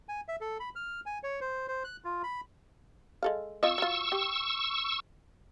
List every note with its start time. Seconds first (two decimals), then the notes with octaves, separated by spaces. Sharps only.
0.09 G#5
0.28 E5
0.41 A4
0.60 B5
0.76 F6
1.06 G#5
1.23 C#5
1.41 C5
1.68 C5
1.84 F#6
2.05 F4
2.23 B5
3.23 G#3 A4 F5
3.63 C4 F4 D#5 C#6 E6
3.78 F#3 F4
4.12 G4